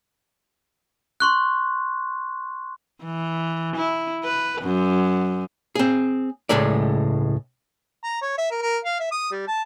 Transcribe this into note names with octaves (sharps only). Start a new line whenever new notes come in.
C6 C#6 F#6
E3
E4
B4
F#2
C4 G#4
C#2 A2 G#3 A3 D5
A#5
C#5
E5
A#4
A#4
F5
E5
D#6
G3
A5